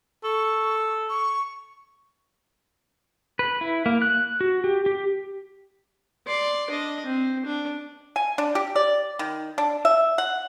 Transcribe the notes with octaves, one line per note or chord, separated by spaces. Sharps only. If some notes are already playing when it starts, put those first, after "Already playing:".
A4 C#6
C#6
B4
E4
A#3
F#6
F#4
G4
G4
D5 C6
D4 D#5
C4
D4
G#5
D4
G4
D5
D#3
D4
E5
F#5